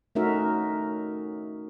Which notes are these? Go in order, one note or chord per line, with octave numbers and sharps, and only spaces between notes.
A3 C#4 D#4 F#4 A#4 E5